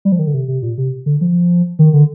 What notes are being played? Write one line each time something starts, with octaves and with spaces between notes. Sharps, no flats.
G3
F3
D#3
D3
C3
C3
A#2
C3
D3
F3
D#3
D3